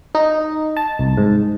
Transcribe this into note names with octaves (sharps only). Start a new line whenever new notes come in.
D#4
A5
C2
G#2